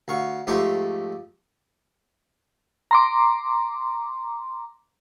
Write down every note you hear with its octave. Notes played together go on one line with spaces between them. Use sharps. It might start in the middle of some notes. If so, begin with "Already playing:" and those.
D2 F5 C#6
F2 G#2 A3 G4 C6 C#6
A#5 C6 D6